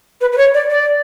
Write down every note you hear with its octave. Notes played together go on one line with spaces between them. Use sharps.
B4
B4
C#5
D5
D5